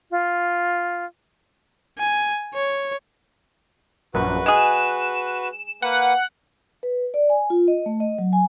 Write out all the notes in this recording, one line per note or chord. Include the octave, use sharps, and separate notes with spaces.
F4
G#5
C#5
A#1 F#2 F#4 B4
G#3 G#4 E7
A#3 B4 F#5
B4
D5
G#5
F4
D#5
A3
D#5
F#3
G#5